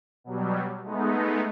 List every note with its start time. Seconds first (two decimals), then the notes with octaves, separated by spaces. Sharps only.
0.24 B2 F#3 G3
0.83 G#3 A3 B3 D#4